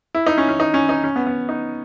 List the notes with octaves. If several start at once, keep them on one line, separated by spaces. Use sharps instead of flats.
E4
D#4
C#4
C#4
D#4
C#4
D#4
C#4
B3
B3
D#4